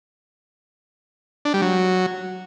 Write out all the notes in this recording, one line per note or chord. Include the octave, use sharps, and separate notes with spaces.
D4
G3
F#3